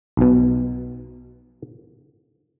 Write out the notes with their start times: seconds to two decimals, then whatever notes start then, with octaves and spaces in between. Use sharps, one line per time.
0.17 B1 B2